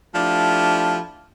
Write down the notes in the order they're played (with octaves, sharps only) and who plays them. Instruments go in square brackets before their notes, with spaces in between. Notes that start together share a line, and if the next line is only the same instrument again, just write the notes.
[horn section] F3 A3 D4 E4 G4